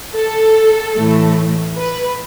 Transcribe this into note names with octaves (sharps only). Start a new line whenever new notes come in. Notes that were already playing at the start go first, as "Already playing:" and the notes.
A4
A2 E3 A3
B4